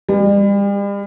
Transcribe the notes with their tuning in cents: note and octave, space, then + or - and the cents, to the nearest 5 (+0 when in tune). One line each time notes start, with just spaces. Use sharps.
G3 +40